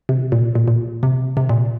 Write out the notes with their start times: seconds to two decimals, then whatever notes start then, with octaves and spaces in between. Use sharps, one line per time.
0.09 C3
0.32 A#2
0.55 A#2
0.68 A#2
1.03 C3
1.37 C3
1.49 A#2